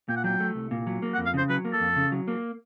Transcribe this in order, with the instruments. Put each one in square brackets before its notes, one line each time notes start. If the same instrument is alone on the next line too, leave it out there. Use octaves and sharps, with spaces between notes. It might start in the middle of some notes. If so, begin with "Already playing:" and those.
[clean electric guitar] A#2 [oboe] G5
[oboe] F#5
[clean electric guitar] F#3 [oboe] G5
[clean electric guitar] A3
C2
A#2
F#3
A#3
[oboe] F#5
[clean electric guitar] F2
[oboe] F5
[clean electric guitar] C#3 [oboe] C5
[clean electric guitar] F#3 [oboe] B4
[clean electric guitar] A#3
[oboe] A4
[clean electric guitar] F2
C#3
F#3
A#3